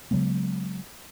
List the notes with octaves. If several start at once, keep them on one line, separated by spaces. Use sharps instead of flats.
C#3 F#3 G#3 B3